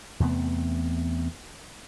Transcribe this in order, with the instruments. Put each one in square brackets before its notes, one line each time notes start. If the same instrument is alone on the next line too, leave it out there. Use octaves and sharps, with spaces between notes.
[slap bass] E2 C3 A3 B3